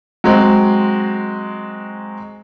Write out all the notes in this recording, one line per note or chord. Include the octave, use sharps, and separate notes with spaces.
F#3 G#3 C4